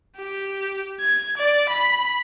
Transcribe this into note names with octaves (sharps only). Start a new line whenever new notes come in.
G4
G#6
D5
B5